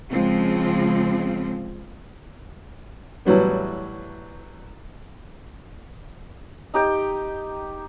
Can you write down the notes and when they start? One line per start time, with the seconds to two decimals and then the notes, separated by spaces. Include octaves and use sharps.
0.10 C#3 F3 G#3 C4
3.25 A2 E3 F#3 G3 B3
6.74 D#4 G4 G5